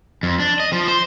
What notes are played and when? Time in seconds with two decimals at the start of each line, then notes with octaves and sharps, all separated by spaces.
0.23 F2
0.40 D4
0.60 D#5
0.73 F3
0.88 C5